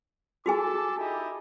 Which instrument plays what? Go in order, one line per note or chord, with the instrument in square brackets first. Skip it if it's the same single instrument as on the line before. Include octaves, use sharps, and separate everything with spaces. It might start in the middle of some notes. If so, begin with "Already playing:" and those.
[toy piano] F#4 G#4 G#5 [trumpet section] A4 A5 D6
[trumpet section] D#4 E4 G4